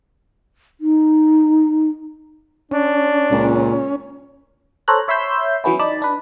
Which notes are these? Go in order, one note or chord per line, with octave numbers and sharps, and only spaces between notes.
D#4
C#4 D4
C#2 A#2
A4 C5 C#5 A#5 F#6
C#5 E5 B5 C6 E6 G6
E3 F#3 B3 C#4 E4
D#4 D5 A5 B5
D4 B4